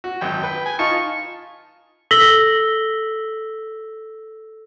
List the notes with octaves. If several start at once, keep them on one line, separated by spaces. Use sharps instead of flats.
F#4
G#1 F#2 G5
B4
G#5
D#4 F4 A5 C#6
A4 E6 A#6 B6 F#7 G7